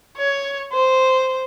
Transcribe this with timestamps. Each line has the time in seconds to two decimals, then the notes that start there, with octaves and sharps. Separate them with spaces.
0.17 C#5
0.73 C5